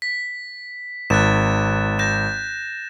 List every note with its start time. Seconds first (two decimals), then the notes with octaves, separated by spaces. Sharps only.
0.02 B6
1.10 G#1 F#6 A6 E7
1.99 G6 A#6 E7